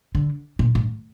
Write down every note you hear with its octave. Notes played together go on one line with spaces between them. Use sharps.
D3
A#2
A2